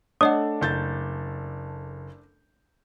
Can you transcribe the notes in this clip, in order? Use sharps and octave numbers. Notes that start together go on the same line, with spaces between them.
A3 D4 A4 C#5 D#5 F#5 D#6
F#1 G6 A6